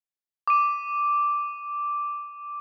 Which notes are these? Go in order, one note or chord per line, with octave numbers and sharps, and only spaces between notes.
D6 D#7